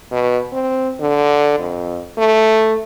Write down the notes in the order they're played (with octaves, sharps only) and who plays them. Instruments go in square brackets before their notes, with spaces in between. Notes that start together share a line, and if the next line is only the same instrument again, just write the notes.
[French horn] B2
C4
D3
F2
A3